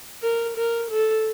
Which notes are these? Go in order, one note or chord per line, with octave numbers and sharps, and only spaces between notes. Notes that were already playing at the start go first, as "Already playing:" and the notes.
A#4
A#4
A4